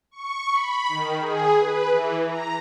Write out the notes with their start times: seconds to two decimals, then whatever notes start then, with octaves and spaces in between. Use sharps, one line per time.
0.11 C#6
0.50 B5
0.88 D#3
1.20 G#4
1.58 B4
1.91 E3
2.26 A#5